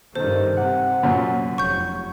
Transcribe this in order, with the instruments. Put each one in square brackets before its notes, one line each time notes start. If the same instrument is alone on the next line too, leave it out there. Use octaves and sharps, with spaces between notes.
[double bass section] G2 D#3 [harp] A4 [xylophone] C5
[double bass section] C3 [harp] F#5
[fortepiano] F#2 A#2 F#3
[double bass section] F1 [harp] C#5 [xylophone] C#6 G6